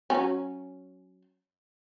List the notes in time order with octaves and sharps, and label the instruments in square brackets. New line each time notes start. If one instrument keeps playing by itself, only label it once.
[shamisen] F#3 C#4